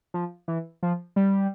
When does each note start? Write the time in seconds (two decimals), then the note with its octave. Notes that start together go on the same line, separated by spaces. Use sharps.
0.14 F3
0.48 E3
0.83 F3
1.16 G3